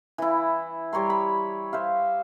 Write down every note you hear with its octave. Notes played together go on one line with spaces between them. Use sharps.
E3 E4
G3 C#5 A#5 C6
B5
C5 E5 F5